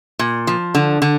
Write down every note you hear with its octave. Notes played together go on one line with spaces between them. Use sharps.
A#2
F3
D3
D3